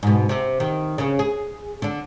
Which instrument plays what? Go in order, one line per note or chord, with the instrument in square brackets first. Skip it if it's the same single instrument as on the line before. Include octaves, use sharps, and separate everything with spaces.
[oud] G#2 B2
C3
D#3
C#3
G#4
D3 D4